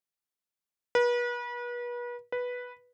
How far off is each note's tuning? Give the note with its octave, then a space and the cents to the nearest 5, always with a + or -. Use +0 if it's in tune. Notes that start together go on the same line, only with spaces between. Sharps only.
B4 -35
B4 -5